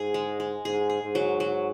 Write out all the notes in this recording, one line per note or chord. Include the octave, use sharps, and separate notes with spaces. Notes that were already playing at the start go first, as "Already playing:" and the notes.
Already playing: G#2 G#4
G#3
G#3
G#2 G#4
G#4
G#2
F#3
F#3